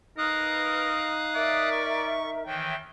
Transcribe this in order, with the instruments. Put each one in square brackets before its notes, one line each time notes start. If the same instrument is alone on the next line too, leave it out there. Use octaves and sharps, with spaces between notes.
[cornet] D#4 [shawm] A#4 [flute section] B4 [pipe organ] F5 D#6 F#6
[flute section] A#4 E5 [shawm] D5
[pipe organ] C#6
[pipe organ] D#3 E3 [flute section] C#5 E5 [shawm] G5